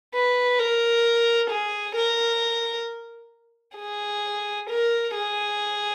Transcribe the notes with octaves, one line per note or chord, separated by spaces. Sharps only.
B4
A#4
G#4
A#4
G#4
A#4
G#4